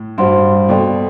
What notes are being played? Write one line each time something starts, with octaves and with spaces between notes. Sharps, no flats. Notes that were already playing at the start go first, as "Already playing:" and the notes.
Already playing: A2
G2 F#4 C5 F#5 C6
B2 F#4 A4 D5 G5